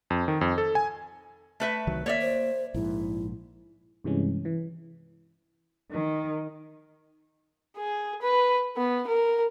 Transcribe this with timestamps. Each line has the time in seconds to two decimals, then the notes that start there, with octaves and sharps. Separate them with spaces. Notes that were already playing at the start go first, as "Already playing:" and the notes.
0.10 F2
0.28 D#3
0.41 F2
0.58 A4
0.75 G#5
1.60 A3 B4 E5
1.87 C2 D#3 F#3
2.06 A#3 C#5 D5 E5
2.21 C5
2.74 A#1 G#2 E4
4.04 G2 C3 E3 G#3 C#4
4.45 E3
5.91 D#3
7.77 G#4
8.21 B4
8.76 B3
9.07 A#4